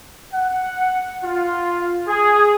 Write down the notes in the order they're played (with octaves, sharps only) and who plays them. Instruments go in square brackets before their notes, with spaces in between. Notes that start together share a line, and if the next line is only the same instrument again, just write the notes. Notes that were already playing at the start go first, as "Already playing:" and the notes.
[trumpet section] F#5
F4
G#4